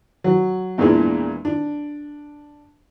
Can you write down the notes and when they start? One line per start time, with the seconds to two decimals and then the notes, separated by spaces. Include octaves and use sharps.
0.24 F#3
0.78 E2 A#2 E3 G#3 D4
1.45 D4